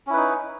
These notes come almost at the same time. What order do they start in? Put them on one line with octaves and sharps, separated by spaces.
C#4 E4 B4 D#4